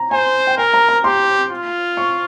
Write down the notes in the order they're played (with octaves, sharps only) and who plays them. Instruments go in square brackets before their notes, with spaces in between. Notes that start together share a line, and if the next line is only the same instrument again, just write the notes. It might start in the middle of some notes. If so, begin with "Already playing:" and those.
Already playing: [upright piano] A#5
[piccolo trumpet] C5 [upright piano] G#5
[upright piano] G5
[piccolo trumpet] A#4 [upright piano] G#5
[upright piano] A#5
A#5
[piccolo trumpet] G4 [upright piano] C6
[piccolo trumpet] F4
[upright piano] C#6